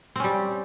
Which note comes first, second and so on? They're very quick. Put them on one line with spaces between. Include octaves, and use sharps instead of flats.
C4 C#4 G3